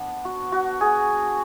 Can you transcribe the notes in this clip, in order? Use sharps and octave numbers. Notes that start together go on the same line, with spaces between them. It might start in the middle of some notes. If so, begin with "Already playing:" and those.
Already playing: B3 D4
F#4
F#4
G#4